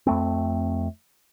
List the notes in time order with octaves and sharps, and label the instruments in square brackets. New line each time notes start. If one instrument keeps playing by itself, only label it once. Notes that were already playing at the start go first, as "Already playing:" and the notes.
[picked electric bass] F2 A3 C4